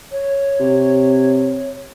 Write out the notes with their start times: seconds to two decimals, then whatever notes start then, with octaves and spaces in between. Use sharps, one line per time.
0.12 C#5
0.60 C3